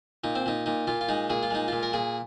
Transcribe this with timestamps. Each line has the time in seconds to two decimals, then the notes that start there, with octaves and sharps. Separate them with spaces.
0.24 A#2 D#4
0.35 C4
0.46 A#2 D#4
0.66 A#2 D#4
0.87 A#2 F4
1.01 F4
1.09 G#3 D#4
1.30 A#2 G#4
1.43 F4
1.50 G#3 D#4
1.68 A#2 F4
1.83 A#4
1.93 A#2 G#4